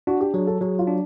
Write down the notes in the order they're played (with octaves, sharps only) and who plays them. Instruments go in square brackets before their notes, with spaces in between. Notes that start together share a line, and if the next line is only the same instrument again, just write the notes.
[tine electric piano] D4 [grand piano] F#4
[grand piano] G4
[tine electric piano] F#3 [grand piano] G#4
[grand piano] A4
[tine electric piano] F#3 [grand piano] G#4
[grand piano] F4
[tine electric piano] D4